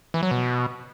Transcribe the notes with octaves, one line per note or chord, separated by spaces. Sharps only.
E3
F#3
B2